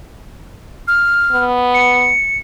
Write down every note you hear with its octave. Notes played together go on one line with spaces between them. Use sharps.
F6
B3
C#7